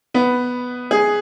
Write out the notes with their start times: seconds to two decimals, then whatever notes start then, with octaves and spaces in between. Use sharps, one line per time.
0.14 B3 B4
0.91 G#4